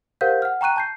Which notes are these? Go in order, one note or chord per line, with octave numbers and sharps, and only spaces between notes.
G4 A#4 C5 F5 F#5 G6
F#5 F6
G5 A#5 C#6 F#6 D#7
A5 G6 C7